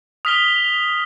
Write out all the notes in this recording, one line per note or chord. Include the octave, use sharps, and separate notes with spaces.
D#6 F6 B6 F7 G7